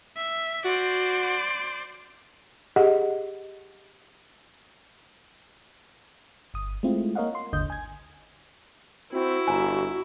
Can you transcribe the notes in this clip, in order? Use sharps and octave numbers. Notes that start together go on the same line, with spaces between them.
E5
F#4 C5 D5
G4 G#4 D#5 F#5
G1 D#6
G#3 A3 C4 E4 F4
A#3 A#4 C#5 D#5 F5 F#5
C6
G#1 D#2 D3 D#5 D#6 G6
G#5 G#6
C4 E4 F#4
G1 G#5 A#5